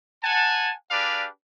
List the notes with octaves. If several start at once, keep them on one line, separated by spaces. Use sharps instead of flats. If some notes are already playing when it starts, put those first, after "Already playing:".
F#5 G#5 A5
D4 G4 G#4 B4 D5 F5